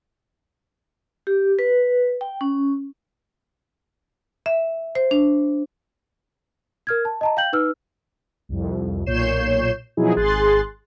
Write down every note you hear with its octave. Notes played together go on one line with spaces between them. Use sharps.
G4
B4
G5
C#4
E5
C5
D4
A#4 F6 G#6
A5
D#5 A5 A#5
F5 G5 G6 F#7
D#4 B4 E6 F6
C2 F2
B1 A#2 C#5 G6 C7 E7
B2 F3 F#3 D#4 E4 G#4
G#1 G#4 C6 F#6 A6